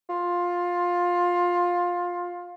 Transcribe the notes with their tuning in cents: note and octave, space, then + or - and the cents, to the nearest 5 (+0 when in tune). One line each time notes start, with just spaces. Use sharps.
F4 +15